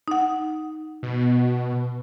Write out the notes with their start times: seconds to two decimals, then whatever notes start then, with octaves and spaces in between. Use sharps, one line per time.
0.08 D#4 F#5
1.03 B2